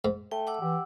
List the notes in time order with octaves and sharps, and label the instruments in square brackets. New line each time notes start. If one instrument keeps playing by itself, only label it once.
[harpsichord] G#2
[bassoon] A3 [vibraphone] G5
[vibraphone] F#5 D6 E6
[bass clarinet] E3 [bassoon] G4